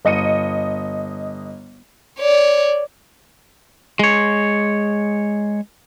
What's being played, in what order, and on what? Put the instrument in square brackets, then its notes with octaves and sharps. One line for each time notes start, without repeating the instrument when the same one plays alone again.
[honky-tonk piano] G1 D#5 C#7 D#7
[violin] C#5 D5
[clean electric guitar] G#3 C#5